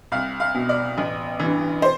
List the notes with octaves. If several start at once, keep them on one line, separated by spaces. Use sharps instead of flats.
C2 F5
F5
B2
D5
A1
G2 E3
C5